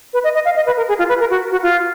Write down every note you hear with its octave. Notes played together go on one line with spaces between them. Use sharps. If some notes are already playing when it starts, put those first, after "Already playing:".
B4
D#5
D#5
F5
D#5
B4
A#4
G#4
F4
B4
A#4
F#4
F#4
F4